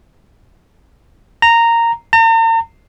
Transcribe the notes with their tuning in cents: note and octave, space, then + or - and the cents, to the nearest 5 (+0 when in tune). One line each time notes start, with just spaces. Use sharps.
A#5 -10
A#5 -45